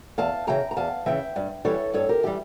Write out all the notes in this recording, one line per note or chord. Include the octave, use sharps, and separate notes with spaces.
E2 F5 A5
C#3 E3 G5 A#5
A#5
E2 F5 A5
C#3 E3 E5 G5
G2
E3 G3 A4 C#5
G2 A4 C#5
G4 A#4
E3 G3 G4